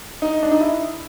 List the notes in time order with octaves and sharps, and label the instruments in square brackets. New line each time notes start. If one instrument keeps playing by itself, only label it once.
[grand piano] D#4
D4
D#4
E4